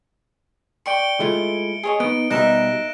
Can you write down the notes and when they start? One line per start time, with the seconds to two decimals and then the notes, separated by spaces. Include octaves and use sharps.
0.86 D5 G5 C#6 C#7 D7 G7
1.20 G#3 A3 E4 F4
1.83 G#4 C#5 D#5
2.00 B3 D#4 D#6 D7
2.30 B2 G3 D#4 A#4 E5 F#6 A#6 E7